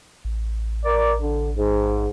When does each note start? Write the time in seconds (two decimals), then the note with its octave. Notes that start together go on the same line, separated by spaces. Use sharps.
0.25 A1
0.84 A#4 D5
1.21 D3
1.56 G#2